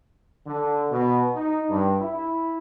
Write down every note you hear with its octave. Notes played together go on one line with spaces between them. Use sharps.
D3
B2
D#4
G2
E4